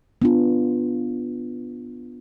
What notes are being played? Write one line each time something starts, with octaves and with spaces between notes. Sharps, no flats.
B3 D4 F4